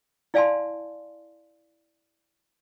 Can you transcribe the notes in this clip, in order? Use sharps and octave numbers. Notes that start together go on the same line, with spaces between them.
E4 D5 F5 G#5 A5 C6